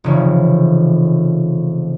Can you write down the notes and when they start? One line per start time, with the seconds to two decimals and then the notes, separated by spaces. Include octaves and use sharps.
0.04 F1 C#3 E3